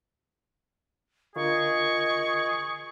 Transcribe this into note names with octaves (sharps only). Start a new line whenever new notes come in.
D3 F4 G#4 A#4 D#5 C#6